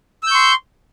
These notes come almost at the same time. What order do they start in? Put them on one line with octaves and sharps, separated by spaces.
E6 G6 C#6 C6